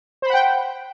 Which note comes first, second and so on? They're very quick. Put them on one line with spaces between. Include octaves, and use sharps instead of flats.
C5 B5 F#5 G5